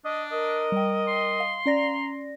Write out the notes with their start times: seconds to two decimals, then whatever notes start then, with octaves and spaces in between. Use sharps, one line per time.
0.05 D4 D#5
0.32 A#4 D#5
0.72 G3 G5
1.08 C6
1.40 F5
1.66 C#4 D5 A#5 A#6